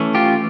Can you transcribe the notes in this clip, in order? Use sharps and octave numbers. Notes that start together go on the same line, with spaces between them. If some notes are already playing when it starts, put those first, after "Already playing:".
Already playing: E3 A3 C#4
F4 G4